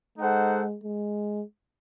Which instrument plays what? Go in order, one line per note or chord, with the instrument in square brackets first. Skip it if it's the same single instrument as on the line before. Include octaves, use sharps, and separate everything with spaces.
[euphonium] G#3 [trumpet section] D#4 A4 C5 F#5
[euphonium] G#3